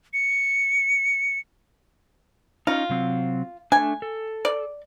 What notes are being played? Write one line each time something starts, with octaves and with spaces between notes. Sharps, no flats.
C#7
C#4 D#4 F4
C3 F#3 C4
A3 D4 G#5
A4
D5